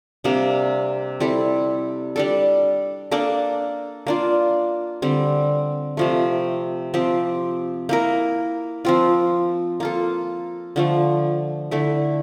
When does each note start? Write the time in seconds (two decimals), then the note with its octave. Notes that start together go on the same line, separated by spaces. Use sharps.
0.24 C3 G3 A#3 D4
1.20 G3 C4 E4 A4
2.16 G3 D4 A4
3.11 A#3 D4 A4
4.07 A#3 D4 F4
5.02 D3 G3 C4
5.97 C3 F3 A3
6.94 F3 C4 G4
7.89 A#3 E4 A#4
8.85 F3 C4 F4
9.80 A#3 F4 A4
10.76 D3 F3 A3
11.71 D3 A3 E4